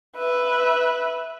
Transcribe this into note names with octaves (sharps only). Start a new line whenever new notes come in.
B4 E5